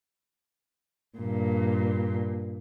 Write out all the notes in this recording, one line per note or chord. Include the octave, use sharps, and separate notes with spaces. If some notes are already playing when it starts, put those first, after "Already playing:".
G2 A#2